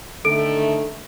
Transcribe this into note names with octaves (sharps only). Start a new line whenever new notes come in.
D3 D#3 A3 A4 D7